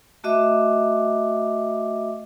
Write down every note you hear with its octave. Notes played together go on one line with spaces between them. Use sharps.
A3 F#4 D#5 E5 D6